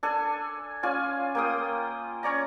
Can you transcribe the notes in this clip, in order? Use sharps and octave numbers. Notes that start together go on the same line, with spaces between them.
D4 A4 G#5
C#4 F4 D5 G#5
A#3 G5 D#6
C#4 C#5 D5 A#5